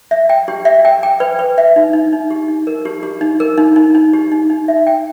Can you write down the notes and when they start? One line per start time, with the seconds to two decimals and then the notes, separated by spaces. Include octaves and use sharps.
0.11 E5
0.29 G5
0.48 G4
0.65 E5
0.85 G5
1.03 G5
1.20 B4
1.39 B4
1.58 E5
1.76 D#4
1.93 D#4
2.13 D#4
2.30 G4
2.48 D#4
2.67 A#4
2.85 G4
3.03 G4
3.21 D#4
3.40 A#4
3.58 D#4
3.76 D#4
3.95 D#4
4.13 G4
4.32 D#4
4.50 D#4
4.68 E5
4.87 G5